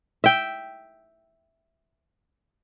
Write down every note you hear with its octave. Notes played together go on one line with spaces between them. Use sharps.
E5 G5